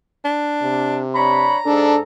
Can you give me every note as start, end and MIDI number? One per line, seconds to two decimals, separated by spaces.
0.25 1.03 62
0.63 1.51 48
1.15 1.58 62
1.15 1.58 73
1.15 2.02 82
1.15 1.58 83
1.66 2.02 44
1.66 1.98 62
1.66 2.02 69